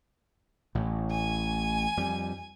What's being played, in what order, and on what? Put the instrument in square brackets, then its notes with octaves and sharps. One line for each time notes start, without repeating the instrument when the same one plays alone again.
[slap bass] A1 A2
[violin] G#5
[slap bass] F2 G3